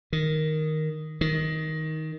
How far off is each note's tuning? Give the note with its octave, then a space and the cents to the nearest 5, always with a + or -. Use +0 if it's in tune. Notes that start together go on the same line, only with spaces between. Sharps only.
D#3 +0
D#3 +10